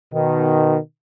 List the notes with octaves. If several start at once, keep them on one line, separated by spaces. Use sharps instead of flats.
B2 D#3